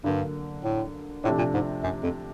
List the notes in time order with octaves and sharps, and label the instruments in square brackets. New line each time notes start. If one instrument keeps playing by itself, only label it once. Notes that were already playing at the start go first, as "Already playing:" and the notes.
[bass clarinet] G2 [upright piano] D3 F#3 A#3
[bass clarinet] A2
[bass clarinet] A2 [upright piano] C3 F3 A3 D4
[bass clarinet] A#2
G#2
F#2
F2